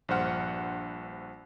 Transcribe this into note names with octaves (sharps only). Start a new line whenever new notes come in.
A#1 G2 C5 F#5 F6